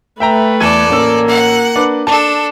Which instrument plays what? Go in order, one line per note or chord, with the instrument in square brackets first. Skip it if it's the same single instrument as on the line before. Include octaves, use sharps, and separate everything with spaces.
[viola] A3 B4 [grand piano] E5 G5 A#5
[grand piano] E2 G#6 D#7 [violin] A4 D5
[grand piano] A1 C#4 E6 [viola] A#3
[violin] F#5
[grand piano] D4 B4 D6
[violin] D4 A4 [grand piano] A5